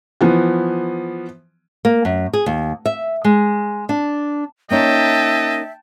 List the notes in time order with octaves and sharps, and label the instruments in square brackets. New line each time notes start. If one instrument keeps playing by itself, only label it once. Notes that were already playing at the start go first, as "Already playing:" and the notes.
[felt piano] E3 F3 B3
[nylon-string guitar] A#3
F#2
G#4
D#2
E5
G#3
D4
[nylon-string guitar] A#3 C#4 D#4 [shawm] D#5 [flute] E5 [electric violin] G5 A5